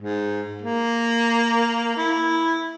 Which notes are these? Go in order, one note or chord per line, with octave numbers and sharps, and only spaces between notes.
G#2
A#3
E4